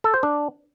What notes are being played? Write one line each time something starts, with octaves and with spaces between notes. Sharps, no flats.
A4
C5
D4